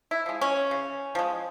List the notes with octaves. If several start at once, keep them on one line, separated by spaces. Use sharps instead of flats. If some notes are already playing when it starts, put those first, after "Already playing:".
E4
F3 G#3
C#4
C#3
F3 G#3